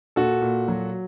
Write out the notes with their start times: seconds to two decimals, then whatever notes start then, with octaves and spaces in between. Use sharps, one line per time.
0.16 A#2 F#4 A4
0.42 A#2
0.68 F#3